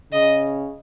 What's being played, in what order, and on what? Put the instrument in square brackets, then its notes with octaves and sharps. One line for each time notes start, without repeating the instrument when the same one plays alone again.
[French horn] C#3 [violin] D#5